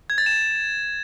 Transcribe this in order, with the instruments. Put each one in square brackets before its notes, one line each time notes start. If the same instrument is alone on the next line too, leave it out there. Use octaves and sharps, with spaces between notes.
[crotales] G#6
A6
E7